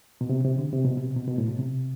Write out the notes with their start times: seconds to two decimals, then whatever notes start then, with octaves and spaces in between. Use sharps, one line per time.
0.21 B2
0.29 C3
0.45 C3
0.58 D3
0.73 C3
0.85 B2
0.97 C3
1.16 B2
1.28 B2
1.38 A2
1.48 B2
1.59 C3